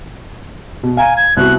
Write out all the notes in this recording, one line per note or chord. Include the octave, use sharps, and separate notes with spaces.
B2
F5 G#5 A#5
G#6
C2 B3 F#4 F#6